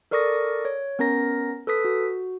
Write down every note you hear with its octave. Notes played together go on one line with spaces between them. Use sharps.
A4 A#4 D5 C#6 D#6 A#6
C#5
B3 C#4 A#4 A#5 A#6
A4 B4 D#6 B6
F#4